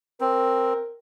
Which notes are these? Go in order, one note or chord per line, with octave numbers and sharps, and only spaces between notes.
C4 A#4